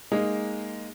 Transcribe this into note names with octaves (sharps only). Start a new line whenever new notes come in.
G#3 A#3 D#4 G#4